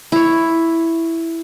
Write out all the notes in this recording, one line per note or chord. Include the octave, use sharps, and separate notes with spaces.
E4 C#5